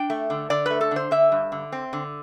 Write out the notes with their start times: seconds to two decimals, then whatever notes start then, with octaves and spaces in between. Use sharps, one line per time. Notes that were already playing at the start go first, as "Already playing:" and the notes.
Already playing: D4 G5
0.10 A3
0.30 D3
0.50 D3 D5
0.66 A3 B4
0.81 A4
0.91 D3 C5
1.11 D3 E5
1.32 G2
1.52 D3
1.72 C4
1.93 D3